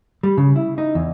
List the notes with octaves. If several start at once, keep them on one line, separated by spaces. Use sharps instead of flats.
G3
C#3
E4
D#4
E2